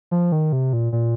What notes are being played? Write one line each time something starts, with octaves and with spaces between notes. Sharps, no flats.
F3
D#3
C3
A#2
A#2